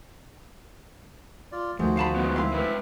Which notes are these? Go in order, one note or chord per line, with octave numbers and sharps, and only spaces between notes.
F4 D5
D2 D#3 F3 A3 F#4 G#4 C5
F5 A5 B5
G#3 B3
C4 E4 E5 F5 C6
G#3 B4